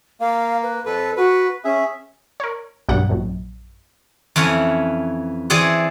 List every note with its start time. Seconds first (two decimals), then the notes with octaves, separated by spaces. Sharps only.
0.21 A#3 F5
0.63 B4
0.85 F2 A4 B4
1.17 F#4 B4
1.65 C#4 G#4 E5
2.40 A#4 C#5
2.89 B1 G2 G3 F#5
3.09 A#1 F#2
4.36 F2 E3 C#4 F#5
5.50 E3 C4 G#4 D5 F#5